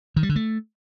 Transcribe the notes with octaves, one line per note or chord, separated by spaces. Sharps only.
D#3
G3
D3
A3